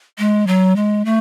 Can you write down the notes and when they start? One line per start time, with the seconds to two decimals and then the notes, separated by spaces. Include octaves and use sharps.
0.18 G#3
0.47 F#3
0.76 G#3
1.05 A3